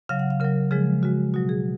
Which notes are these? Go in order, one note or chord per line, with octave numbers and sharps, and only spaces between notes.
C#3 F#3 F5
F#5
F5
C#3 F#3 A#4
C#3 F3 G#3 G#4
C#3 G#3 F#4
B2 F#3 F#4
G#4